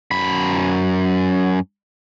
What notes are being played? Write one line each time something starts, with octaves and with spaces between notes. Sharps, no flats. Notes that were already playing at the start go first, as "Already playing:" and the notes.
F#2 B5